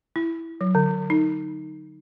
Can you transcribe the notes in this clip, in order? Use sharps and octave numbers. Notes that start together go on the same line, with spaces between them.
E4
F#3
D3
D#4